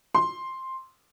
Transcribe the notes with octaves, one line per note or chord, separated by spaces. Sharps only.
C6